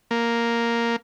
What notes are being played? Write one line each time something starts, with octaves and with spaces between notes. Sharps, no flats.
A#3